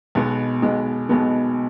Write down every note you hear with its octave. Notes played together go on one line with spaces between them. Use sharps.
B1 B2 G#3 B3
B1 B2 G#3 B3
B1 B2 G#3 B3